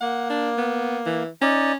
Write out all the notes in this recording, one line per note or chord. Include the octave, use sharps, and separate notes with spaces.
A#3 F#5
D4
B3
E3
C#4 D#4 D5